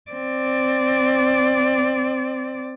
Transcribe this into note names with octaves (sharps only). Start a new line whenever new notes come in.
C4 D5